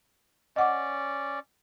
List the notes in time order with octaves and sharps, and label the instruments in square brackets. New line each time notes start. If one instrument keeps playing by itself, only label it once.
[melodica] C#4 D5 [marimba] D#5 F#5 D6